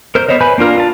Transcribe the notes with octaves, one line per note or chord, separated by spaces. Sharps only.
A#4 C5 G6
B3 C5 C#5 D#5
B4 G#5 B5 G6
A#3 D4 F4 A#4
F4 A5